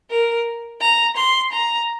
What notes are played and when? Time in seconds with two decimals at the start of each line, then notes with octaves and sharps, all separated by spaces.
0.10 A#4
0.81 A#5
1.16 C6
1.52 A#5